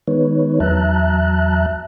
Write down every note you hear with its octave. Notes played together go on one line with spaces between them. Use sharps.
D#3 G#3 B3 D#4 B4 C#5
E2 F#3 E5 A5 A#5 F#6